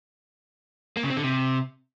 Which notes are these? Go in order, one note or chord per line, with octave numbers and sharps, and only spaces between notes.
A#3
C#3
C4
D3
C3